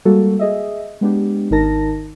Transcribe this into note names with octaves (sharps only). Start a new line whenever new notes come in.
G3 G#3 A#3 F#4 A4
G#4 D#5 E5
G#3 B3 D4 G4
G#1 D#3 D#4 A#4 A5 A#6